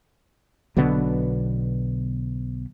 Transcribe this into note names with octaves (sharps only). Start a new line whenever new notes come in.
B1 B2 D3 B3